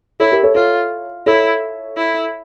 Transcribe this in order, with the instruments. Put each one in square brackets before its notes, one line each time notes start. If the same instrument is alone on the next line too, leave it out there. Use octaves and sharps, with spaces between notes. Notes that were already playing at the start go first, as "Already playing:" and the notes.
[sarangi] E4 [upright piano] A4 C#5
[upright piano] G4 A#4
A4 C#5
[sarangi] F4 [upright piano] A4 C#5
[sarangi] E4 [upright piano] A4 C#5
[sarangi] E4